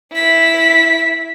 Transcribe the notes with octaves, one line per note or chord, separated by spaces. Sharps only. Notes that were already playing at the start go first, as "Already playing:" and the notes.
E4 B6